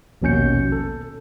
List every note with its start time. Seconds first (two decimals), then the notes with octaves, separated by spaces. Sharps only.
0.22 A#1 D#2 B2 C#4 G6 C#7
0.72 A4